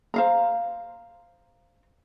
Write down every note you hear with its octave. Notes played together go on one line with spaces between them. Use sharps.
C5 F5 A#5